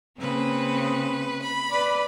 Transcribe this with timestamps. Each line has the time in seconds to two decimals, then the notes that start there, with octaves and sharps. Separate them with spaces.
0.19 C#3 A#3 C4 B4
1.40 B5
1.70 B4 D5